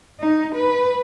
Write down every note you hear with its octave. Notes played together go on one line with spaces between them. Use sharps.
D#4
B4